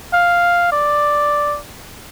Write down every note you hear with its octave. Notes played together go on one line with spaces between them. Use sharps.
F5
D5